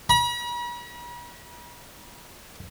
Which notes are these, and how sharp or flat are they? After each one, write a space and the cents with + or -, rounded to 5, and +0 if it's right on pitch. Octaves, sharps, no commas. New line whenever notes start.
B5 -45